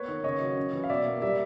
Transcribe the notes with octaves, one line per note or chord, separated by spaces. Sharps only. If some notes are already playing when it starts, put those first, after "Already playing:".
Already playing: A#3 B3 B4 C#5
D#3
C#3 C#5 D#5
F#3
C#4
E3
F5
B2 D5 E5
A#3
G3 D5 E5